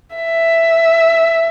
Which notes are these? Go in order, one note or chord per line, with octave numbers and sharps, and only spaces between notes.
E5